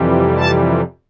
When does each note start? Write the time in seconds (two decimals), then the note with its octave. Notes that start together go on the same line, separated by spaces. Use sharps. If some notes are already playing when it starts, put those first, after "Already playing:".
Already playing: F2 C3 E3 G3
0.37 A5